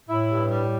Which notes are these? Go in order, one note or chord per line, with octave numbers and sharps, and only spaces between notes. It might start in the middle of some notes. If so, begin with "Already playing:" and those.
A2 E4
G2
G3